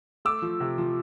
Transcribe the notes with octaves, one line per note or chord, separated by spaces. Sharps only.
A3 D6 E6
F3
C3
F3